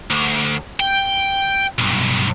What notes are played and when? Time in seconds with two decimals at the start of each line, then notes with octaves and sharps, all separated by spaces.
0.11 D2
0.80 G5
1.78 B1 G2